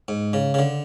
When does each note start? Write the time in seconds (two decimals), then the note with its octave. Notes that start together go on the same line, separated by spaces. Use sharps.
0.08 G#2
0.33 C#3
0.54 C#3
0.59 D3